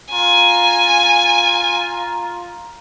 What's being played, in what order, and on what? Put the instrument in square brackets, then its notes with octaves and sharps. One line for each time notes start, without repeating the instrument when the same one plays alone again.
[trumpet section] F4 A#5 [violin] G#5